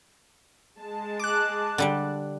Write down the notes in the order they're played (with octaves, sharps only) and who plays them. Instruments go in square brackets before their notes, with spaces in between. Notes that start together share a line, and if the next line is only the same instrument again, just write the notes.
[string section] G#3 A5
[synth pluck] D6 F#6
[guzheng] D3 G3 D4